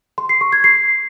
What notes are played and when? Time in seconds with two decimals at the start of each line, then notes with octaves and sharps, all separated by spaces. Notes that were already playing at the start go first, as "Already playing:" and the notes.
0.18 C6
0.29 C7
0.41 C#6
0.52 G#6
0.64 C7